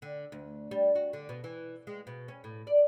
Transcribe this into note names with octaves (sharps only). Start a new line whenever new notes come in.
D3
D2
G3
F#4
D3
B2
E3
G#3
B2
C#4
A2
D5